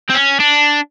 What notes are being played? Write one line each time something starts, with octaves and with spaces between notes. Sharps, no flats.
C4
C#4
D4